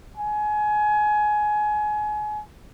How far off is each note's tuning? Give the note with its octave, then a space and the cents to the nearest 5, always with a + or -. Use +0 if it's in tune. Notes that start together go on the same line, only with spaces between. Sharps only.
G#5 +25